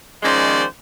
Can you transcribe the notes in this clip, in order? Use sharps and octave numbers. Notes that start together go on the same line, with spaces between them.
D#3 F3 G#3 C#4 C5 D5